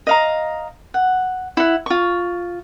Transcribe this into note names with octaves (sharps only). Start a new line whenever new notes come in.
D#5 F5 A#5
F#5
E4 F#5
F4 C#6